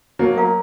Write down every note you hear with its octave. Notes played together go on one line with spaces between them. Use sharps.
F#3 A#3 D#4
A#4 C#5 F5 A#5